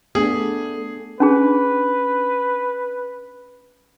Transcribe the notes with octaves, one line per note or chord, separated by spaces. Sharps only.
A3 B3 D4 G#4
C#4 D4 G#4 B4